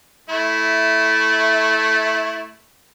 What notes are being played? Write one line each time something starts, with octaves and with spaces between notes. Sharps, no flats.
A3 E4